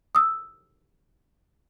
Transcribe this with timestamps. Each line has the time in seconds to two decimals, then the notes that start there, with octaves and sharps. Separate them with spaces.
0.15 D#6 E6